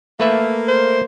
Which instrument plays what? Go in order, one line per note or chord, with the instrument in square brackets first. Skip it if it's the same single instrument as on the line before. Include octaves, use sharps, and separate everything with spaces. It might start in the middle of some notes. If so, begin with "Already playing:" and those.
[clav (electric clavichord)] A3 B4 E5 [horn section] A#3
[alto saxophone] C5